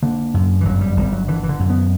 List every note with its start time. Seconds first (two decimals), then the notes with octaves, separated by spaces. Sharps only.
0.03 D3 A#3
0.34 F#2
0.61 E3
0.65 G1 F#3
0.81 G3
0.97 G1 G3
1.12 F#3
1.28 D3 E3
1.43 E3
1.49 D3
1.59 F#2
1.70 B3